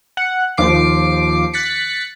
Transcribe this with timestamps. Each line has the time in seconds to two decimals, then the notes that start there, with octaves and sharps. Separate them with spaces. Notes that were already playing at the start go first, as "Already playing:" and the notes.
0.17 F#5
0.57 D#2 F3 D6 C7
1.53 F#6 A6 B6 C#7